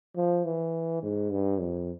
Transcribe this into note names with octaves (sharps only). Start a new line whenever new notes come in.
F3
E3
G#2
G2
F2